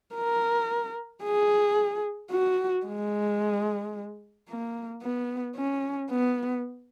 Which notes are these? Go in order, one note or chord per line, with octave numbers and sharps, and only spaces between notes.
A#4
G#4
F#4
G#3
A#3
B3
C#4
B3